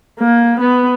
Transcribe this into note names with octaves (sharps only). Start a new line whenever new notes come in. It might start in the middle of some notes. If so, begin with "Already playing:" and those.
A#3
B3